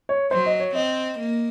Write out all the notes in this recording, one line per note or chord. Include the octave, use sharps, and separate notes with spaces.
C#5
F#3 C5
D#5
C#5
C4 D#5
A#3